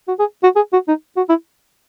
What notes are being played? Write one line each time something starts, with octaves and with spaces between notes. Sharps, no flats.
F#4
G#4
F#4
G#4
F#4
D#4
F#4
E4